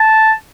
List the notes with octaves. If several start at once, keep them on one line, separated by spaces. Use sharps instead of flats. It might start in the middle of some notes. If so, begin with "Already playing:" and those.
Already playing: A5